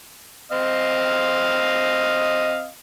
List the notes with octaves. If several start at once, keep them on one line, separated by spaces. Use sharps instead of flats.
C4 D#5 F5